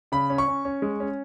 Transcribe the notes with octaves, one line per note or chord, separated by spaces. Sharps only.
C#3 B5
C#4
C#6
C#4
C#4
G#3
C#4